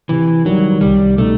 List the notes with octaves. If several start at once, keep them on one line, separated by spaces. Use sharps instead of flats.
C3 E3
D#3 F#3 G3
C2 G3
B2 G3 A3 D#4